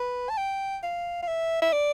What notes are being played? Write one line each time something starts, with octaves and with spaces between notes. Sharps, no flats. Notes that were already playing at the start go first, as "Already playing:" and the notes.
Already playing: B4
A5
G5
F5
F5
E5
E5
D5